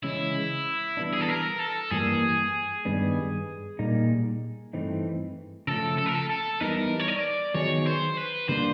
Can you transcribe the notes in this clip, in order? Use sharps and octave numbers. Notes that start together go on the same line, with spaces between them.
C#3 E3 G#3 C#4 E4
E3 G3 B3 D4
G#4
A4
A#4
A4
G2 E3 G3 A#3 G#4
G2 D#3 G3 B3 D4
A#2 G3 A#3 D#4
G2 E3 A3 C4 D#4
C#3 F3 A3 A4
A4
A#4
A4
A4
E3 G3 B3 D#4 A#4
C#5
D5
D#3 F#3 B3 D#4 G#4 C#5
C5
B4
D3 G3 A#3 D4 F4 C5